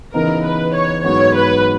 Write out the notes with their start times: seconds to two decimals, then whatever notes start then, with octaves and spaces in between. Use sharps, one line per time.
0.14 C#3 E3 B3 D#4 A#4
0.44 B4
0.74 C#5
1.04 G#2 F#3 B3 C#5
1.35 B4